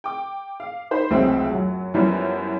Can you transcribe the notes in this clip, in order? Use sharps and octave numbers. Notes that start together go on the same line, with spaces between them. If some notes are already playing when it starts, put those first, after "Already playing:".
G5 D6
F5
D#4 C5 B5
F1 C#2 F#3 C4 E5 G5
F#2 F#3
F#2 F3 G3 B3 C#4 E4